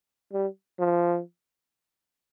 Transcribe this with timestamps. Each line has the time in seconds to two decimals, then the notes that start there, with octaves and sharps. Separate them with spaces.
0.33 G3
0.79 F3